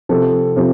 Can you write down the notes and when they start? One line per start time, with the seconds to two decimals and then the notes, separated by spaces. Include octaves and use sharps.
0.09 C3 F3 C4 A4
0.56 C3 F3 C4